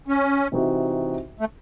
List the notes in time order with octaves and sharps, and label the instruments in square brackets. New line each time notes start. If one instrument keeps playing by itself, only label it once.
[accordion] C#4
[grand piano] C3 E3 C4 D#4 F#4
[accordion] A3